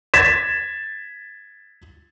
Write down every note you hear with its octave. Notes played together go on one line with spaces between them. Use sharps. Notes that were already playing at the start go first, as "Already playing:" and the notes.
G#6 A6 B6 E7